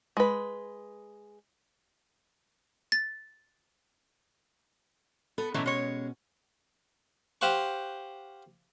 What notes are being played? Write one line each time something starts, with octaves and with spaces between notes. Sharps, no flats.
G#3 B4
A6
B3 A4
B2 E3 F#3 A3 C#4
G#3 C#5
G4 C5 F5 F#5 C#6